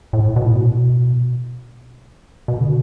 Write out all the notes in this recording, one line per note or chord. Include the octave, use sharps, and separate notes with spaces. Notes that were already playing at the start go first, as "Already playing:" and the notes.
A2
B2
A2
B2
B2
D3